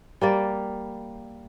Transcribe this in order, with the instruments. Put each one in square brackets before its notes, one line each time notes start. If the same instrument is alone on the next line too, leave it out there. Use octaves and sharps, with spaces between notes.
[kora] G3 A#3 D5